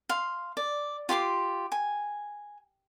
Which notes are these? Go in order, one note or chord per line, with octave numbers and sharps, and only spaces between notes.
F5 C6
D5
F4 G4 C6 D6
G#5